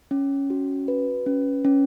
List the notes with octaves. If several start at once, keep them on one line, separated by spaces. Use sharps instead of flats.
C#4
F#4
B4
C#4
C#4